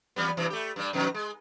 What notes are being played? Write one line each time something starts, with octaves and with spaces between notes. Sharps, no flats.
E2 G3 B3
G2 C3 E3
A3 G4
G2 G3
F2 B2 D#3
G#3